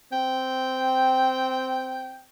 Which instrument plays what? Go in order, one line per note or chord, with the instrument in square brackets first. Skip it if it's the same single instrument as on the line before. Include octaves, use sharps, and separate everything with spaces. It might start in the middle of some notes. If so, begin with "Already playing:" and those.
[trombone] C4 [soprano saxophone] G5